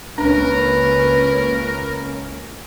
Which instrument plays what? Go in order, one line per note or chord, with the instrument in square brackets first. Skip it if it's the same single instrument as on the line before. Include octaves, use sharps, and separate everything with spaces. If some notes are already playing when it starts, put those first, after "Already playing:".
[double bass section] C#2 A#3 C#4 [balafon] D4 [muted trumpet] A#4 [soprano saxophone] B4